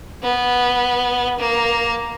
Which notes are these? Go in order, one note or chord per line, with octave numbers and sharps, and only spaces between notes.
B3
A#3